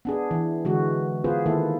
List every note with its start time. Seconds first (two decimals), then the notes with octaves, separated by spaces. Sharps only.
0.05 B3 D4 G#4
0.31 E3
0.65 D3 E3 G#3 F#4
1.24 B3 F4 G#4 B4 C5
1.46 D#3 A#3 E4 A4